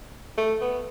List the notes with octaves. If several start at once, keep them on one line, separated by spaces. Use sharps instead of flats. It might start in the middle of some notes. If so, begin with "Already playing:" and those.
A3
B3